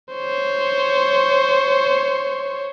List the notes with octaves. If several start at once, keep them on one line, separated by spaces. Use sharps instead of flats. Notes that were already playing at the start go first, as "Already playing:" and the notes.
C5 C#5